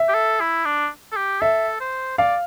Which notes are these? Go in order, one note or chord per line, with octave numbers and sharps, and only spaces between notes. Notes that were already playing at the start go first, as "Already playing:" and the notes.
Already playing: E5
G4
A4
E4
D4
A4
G4
A4 E5
C5
D5 F5